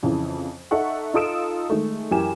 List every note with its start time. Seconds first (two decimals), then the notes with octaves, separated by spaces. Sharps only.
0.03 F2 C#3 E3
0.71 D#4 A4 E5 F#5 C#6
1.14 D#4 F4 A4 D#6 D7 E7
1.70 D#3 G#3 A3
2.11 F#2 E3 G4 A#4 G#5 E7